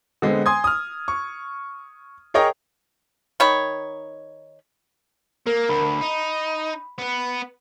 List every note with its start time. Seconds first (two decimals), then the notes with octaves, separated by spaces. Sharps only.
0.22 D3 G#3 B3 C4
0.46 G#5 C6 D#6 G#6
0.64 D#6 F6
1.08 C#6
2.34 G#4 A#4 C#5 D#5 G5
3.40 D#3 D#4 C#5 B5
5.47 A#3 A#4
5.69 D2 B5
6.01 D#4
6.98 B3 B4